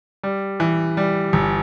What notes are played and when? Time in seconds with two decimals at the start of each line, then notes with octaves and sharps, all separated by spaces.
0.24 G3
0.60 E3
0.97 G3
1.33 G1